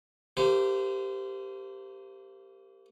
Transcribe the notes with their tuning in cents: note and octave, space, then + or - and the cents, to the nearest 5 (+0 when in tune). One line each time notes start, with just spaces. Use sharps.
A#3 -30 G4 +0 C5 -30